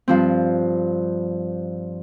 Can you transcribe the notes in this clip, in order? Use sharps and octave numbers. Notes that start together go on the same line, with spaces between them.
G2 F3 C4